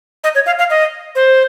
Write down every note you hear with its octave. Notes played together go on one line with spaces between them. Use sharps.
D#5
C#5
F5
F5
D#5
C5